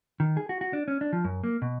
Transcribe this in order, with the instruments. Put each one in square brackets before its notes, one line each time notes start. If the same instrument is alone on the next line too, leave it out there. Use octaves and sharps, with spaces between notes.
[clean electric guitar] D#3
G#4
F#4
F#4
D4
C#4
D4
F3
F#2
A#3
B2